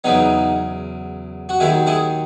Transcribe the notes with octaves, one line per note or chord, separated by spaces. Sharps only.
E2 C#3 F#3 B3 D#4
F#4
D#2 D#3 F#3 E4 G#4
E4 G#4